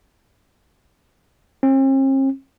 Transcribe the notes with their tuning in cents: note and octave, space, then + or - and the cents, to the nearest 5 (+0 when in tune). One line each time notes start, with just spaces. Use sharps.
C4 +45